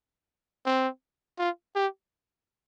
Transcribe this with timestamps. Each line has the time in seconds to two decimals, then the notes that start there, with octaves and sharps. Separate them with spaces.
0.66 C4
1.39 F4
1.76 G4